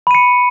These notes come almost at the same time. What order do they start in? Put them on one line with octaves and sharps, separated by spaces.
B5 D#7 C#7